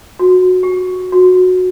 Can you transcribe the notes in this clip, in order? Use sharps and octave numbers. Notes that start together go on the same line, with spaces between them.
F#4
G4
F#4